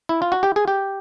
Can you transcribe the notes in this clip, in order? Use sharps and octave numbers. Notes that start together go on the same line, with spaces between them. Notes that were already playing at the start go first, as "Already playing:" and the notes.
E4
F4
F#4
G4
G#4
G4